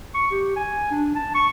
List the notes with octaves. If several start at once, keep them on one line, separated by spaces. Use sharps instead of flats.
C#6
G4
G#5
D4
A5
C#6